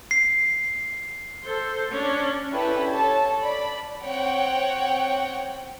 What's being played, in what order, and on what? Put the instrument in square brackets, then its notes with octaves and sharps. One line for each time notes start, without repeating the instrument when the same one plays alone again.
[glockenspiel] C7
[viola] A4 C5
C#4 D4
[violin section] C#4 D4 E4 G4 A4 B4
A4 C#5 A5
D5 B5
C4 C#5 F#5 G5